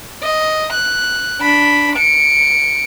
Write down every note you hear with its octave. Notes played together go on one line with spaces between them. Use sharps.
D#5
F#6
D4 B5
C#7 D7